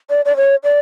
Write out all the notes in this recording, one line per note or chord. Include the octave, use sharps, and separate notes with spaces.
D5
D5
C#5
D5